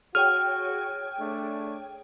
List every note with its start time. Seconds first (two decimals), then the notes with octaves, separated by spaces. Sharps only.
0.15 F#4 G#4 C#5 G5 F6
1.18 A3 D4